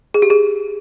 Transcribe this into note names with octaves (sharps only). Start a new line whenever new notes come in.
G#4
G4
G#4